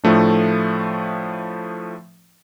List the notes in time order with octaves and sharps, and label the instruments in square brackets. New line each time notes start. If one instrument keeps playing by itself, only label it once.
[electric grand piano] A2 F3 A3 D4